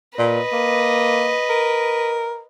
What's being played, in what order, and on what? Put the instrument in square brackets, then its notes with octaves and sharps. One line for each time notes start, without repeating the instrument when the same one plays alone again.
[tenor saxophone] A#2 [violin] B4 D#5
[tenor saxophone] A#3
A#4